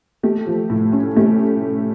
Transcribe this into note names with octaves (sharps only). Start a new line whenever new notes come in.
A3 G4
F3
A2
C#4
A3 G4